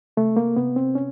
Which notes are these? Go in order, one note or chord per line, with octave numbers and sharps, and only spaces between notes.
C3 A3
A#3
C3 B3
C4
C#4